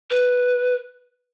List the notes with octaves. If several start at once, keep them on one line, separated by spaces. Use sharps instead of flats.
B4